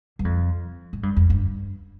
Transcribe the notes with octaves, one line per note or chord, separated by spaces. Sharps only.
G2
F2
A2
G2
F2
G2